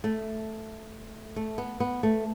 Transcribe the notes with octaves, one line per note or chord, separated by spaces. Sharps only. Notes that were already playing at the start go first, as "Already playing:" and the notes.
A3
A3
B3
B3
A3